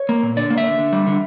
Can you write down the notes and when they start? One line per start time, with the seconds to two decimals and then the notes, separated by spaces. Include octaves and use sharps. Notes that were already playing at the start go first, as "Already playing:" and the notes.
Already playing: C#5
0.09 A#3
0.23 A#2
0.37 D3 D5
0.50 A#3
0.58 E5
0.64 D3
0.78 D3
0.93 G3
1.07 D3